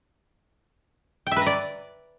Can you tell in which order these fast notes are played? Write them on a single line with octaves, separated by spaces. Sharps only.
G5 E5 B4 A#5 D5